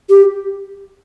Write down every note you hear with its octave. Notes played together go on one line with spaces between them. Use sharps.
G4